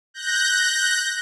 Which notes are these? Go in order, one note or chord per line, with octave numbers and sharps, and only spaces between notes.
F#6 G6 A#6